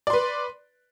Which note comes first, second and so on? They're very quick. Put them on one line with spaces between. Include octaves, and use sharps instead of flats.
D5 C6 B4